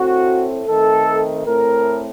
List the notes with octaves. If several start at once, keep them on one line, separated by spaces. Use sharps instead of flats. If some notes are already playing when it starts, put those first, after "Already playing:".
Already playing: A2 A3 C4 F#4
D#3 A3 C4 A4
A2 A3 C4 A#4